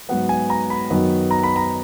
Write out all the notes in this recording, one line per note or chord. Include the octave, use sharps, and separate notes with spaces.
G#2 F#3 B3 F#5
G#5
A#5
B5
F#2 D#3 F#3 B3
A#5
B5
A#5